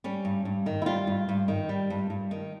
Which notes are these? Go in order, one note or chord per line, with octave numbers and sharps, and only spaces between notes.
G3 C#4
G2
G2
D#3
E4
G3 F4
G2
G2
D#3
G3
G2
G2
D#3